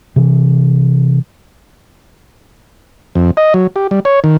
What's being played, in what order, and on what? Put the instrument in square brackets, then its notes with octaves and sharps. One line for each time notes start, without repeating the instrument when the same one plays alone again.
[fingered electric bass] C3 E3
[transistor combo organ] F2
D#5
F#3
G4
G3
C#5
D#3